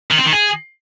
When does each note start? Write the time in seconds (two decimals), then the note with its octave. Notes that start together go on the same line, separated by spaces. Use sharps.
0.11 D#3
0.19 C4
0.26 D#3
0.33 G#4